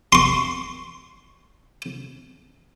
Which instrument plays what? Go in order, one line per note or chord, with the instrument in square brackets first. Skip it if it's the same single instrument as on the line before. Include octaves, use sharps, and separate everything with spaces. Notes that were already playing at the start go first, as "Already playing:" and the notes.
[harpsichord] C6 C#6